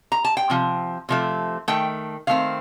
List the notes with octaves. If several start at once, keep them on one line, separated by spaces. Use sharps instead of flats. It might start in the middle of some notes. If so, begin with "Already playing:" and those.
A#5
A5
G5
C3 F3
C3 F3 A3
D#3 A3 G5
D#3 A3 C4 F5